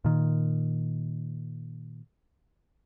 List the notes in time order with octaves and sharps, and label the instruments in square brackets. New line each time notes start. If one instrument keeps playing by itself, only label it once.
[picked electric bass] A#2 D#3